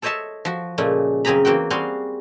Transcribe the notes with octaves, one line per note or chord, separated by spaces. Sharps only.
A4 C5 C#5 D#5 E5 A5
F3 F#4
A#2 C#3 G#3 A3
F#2 C#3 C4 G#4 A#5 B5
E2 A#3 C4 F#4 G5
G3 C4 F#4 G#4 F5 C6